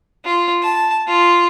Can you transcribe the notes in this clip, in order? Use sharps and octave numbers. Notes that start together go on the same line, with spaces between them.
F4
A5
F4